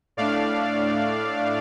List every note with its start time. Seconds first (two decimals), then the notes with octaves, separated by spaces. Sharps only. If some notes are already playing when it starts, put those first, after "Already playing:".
0.17 A2 A3 D4 D5 F5